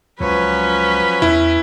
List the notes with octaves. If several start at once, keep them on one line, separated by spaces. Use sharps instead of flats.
C#2 F3 F#3 C#4 B4 C#5
E2 E4